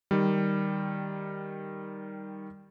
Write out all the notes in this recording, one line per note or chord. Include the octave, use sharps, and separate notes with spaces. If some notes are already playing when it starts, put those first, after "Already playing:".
D#3 G3